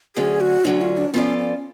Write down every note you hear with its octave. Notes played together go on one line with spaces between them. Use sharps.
D2 D3 F#3 C#4 G#4
F#4
D2 D3 F#3 C#4 D4
F4
D4
F3 B3 C#4 F4 A4 D5
C#4